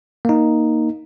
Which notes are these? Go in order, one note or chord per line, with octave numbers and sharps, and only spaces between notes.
A#3 D#4